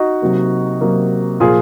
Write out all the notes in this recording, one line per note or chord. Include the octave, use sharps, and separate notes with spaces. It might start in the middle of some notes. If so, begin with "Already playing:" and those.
Already playing: D#4 F#4
C3 F#3 A#3
C3 F#3 A#3
A#2 F3 A#3 F4 G#4